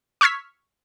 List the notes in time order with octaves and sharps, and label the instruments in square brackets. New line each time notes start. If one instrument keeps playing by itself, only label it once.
[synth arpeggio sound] C#6 E6 F6 G#6 B6